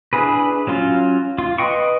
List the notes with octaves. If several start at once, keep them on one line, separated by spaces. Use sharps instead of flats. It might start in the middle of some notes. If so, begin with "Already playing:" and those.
D4 E4 G#4 B4
F#3 C#4 F4
F4
B4 D#5 G5 C6 C#6